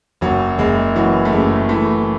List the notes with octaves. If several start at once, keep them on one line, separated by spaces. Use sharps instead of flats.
F#1 F#3
F#1 G#3
E3 F#3
A3
F#2 G#3
E3 A3